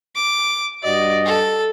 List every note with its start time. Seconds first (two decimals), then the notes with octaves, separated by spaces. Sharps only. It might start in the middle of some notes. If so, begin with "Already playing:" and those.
0.16 D6
0.83 G2 F#4 D5 D#5
1.26 A4